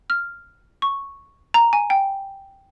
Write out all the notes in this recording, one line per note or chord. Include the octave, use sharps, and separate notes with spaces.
F6
C#6
A#5
G#5
G5